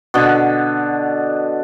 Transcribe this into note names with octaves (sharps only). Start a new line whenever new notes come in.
B2 D3